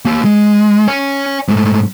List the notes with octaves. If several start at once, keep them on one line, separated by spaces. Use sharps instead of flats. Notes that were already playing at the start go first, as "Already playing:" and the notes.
A#3 G4
G#3
C#5 G#5
G#2 A3